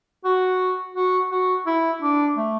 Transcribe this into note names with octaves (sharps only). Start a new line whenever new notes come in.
F#4
F#4
F#4
E4
D4
A3